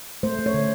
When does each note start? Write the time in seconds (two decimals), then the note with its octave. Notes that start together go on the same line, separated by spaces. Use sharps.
0.23 A3 C5
0.39 A3
0.46 C#5
0.54 D3